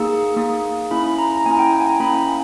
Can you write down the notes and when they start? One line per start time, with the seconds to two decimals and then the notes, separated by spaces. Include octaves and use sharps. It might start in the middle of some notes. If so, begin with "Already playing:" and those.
Already playing: A#3 D#4 G#4 E6
0.37 A#3 D#4 G#4 D#6
0.91 A#3 C#4 E4 B5
1.18 A#5
1.37 A#5
1.46 A#3 C#4 E4 G#5
1.59 G5
1.73 G5
1.80 G#5
1.86 A#5
2.00 A#3 C#4 E4 B5